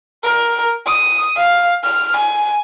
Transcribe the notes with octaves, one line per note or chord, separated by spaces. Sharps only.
A#4
D#6
F5
F6
G#5